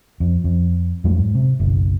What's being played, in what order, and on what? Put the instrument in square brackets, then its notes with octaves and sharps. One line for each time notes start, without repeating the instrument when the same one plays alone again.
[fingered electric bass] F2
F2
F2 F#3 A3
G#2
C3
F#1 B1